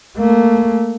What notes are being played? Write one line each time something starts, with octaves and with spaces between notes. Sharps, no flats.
A3 A#3